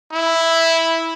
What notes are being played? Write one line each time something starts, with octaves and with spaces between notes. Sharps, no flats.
E4